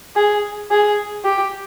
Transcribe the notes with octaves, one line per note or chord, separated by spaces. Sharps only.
G#4
G#4
G4